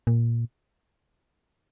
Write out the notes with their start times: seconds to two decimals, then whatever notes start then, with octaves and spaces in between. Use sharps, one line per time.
0.07 A#2